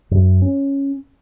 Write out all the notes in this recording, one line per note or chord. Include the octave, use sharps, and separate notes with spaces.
F#2
C#4